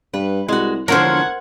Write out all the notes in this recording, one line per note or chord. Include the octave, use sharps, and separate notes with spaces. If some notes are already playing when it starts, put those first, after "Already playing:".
G2 B4
C2 G#3 F#4
E1 D3 F3 A#4 C5 C#5 F#5 G#6